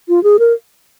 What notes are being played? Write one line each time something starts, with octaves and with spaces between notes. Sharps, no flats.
F4
G#4
A#4